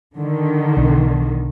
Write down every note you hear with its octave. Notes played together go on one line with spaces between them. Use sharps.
D3 D#3
B1